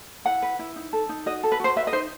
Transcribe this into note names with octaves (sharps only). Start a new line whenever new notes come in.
E4 F#5
B4
E4
D#4
A4
D#4
F#4 D#5
A4
B4
F#4 C5
B4 E5
D#5
D#4 C5